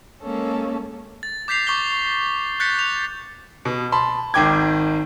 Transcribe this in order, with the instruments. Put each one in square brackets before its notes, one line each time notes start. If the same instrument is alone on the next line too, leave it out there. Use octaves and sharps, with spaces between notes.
[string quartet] G#3 A#3 C#4 A4
[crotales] A6
D6 G6 B6 C7 F7
C#6 D6 G6 A6 G7
F#6 G6 A6 B6 C#7
F7
[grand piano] B2
A5 B5 C6
G#1 D#3 G5 D6 G#6